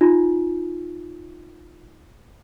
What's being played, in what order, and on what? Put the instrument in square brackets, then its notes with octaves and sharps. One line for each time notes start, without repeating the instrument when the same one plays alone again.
[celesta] D#4 F4